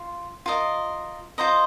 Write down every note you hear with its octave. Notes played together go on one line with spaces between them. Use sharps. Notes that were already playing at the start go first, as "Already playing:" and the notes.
Already playing: F4
F4 A#4 D#5
F4 C5 D#5 A#5